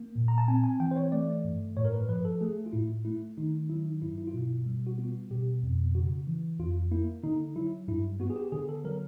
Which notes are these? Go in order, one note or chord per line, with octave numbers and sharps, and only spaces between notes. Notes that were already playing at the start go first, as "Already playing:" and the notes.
Already playing: A#3
A#2
A#5
A5
C4 G#5
G#5
E3 G5
C5
C#5
A3 D5
G2
A2 C#5
A#4
B4
F3 B4
A4
A4
A3 G#4
F4
A2 E4
A3 E4
D#3 D#4
F#3 E4
D#4
G2 E4
E4
F4
B2 E4
G3
F#4
B3 F4
B2 G4
F2
C#3 F#4
E3
F2 F4
A#3 E4
D3 D#4
F#3 E4
G2 E4
B3 F#4
G#4
G4
D3 G#4
A4
F#3 A#4